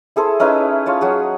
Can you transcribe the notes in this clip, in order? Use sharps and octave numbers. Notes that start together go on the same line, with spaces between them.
E4 G#4 A4 C5
C#4 D#4 E4 B4
F4 C#5 A5
F#3 F#4 G#4